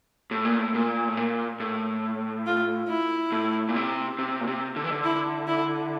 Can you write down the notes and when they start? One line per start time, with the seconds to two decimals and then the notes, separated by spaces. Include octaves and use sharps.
0.31 A2
0.45 A#2
0.58 A2
0.75 A#2
1.08 A2
1.17 A#2
1.60 A2
2.46 F4
2.89 E4
3.32 A2
3.69 A#2
3.76 C3
4.19 C3
4.41 A#2
4.47 C3
4.76 D3
4.84 E3
4.92 D3
5.04 E4
5.48 E4